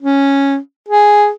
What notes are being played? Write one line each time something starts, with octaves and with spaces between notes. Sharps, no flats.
C#4
G#4